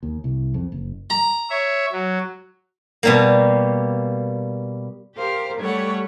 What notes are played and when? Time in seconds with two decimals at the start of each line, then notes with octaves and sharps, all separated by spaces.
0.03 D#2
0.24 C2
0.54 F2
0.72 F#1
1.10 A#5
1.50 C#5 E5
1.92 F#3
3.03 B2 G3 A#3
5.15 G4 A#4 C5 F5
5.58 G3 A3 G4 A4 C#5 F#5